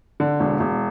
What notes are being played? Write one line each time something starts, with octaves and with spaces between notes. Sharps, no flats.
D3
E1
E1